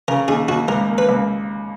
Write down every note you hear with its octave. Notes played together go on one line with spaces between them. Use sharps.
C#3 A#4
D#2 G#4
D#2 F#4
C#2 A#4
A#3
B4
C#2